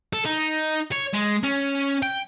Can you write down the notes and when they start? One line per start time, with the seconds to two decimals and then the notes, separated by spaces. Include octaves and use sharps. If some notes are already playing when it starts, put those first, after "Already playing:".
0.13 A4
0.25 D#4
0.92 C#5
1.14 G#3
1.43 C#4
2.03 G5